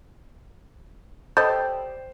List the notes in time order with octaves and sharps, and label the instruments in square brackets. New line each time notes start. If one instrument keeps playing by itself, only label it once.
[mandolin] G4 D5 G5 [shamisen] A4 D#5 [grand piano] C5 [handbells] B5 G6